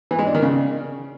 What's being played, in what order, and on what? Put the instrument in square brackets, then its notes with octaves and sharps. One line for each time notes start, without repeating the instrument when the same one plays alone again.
[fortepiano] E3
G#3
D4
D#3
C#3